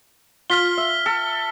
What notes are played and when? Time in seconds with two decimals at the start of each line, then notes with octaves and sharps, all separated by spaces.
0.50 F4 F6 B6 G7
0.77 E5
1.06 A4